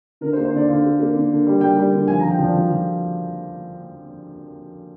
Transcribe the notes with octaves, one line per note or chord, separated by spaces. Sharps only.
D3 A#4
C5
A#3
C5
D3 D5
D3 F5
A#3
A#3
D3
D3
G3
G3 G5
G3
D3
F3 G#5
A#5
F3
G5
F3 D5
F3
F3